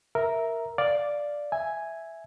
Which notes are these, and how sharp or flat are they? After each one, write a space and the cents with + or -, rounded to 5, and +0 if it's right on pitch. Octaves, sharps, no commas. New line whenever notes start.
A#4 +0 E5 -5 A#5 +5
D5 +0 F5 +0
E5 +0 G#5 +0